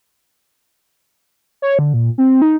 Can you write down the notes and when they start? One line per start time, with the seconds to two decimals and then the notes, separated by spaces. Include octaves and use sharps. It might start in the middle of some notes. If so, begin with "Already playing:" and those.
1.62 C#5
1.79 D3
1.94 A#2
2.18 C4
2.42 D#4